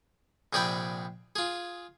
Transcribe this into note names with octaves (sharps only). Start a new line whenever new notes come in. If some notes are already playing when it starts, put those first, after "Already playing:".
A#1 C3 G#4 D5 G5 B5
F4 G#4